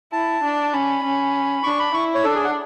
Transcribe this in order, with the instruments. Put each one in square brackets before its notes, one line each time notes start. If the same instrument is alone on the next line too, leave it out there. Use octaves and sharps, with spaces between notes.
[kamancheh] E4 [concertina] A5
[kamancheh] D4
[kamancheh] C#4 [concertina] B5
[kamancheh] C#4
[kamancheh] D4 [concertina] C#6
[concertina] B5
[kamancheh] E4 [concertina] C#6
[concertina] C#5
[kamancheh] D4 [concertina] A4
[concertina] G#4
F#5